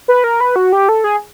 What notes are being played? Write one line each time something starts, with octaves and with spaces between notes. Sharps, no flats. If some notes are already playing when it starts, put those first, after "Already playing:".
B4
A#4
B4
F#4
G4
A4
G#4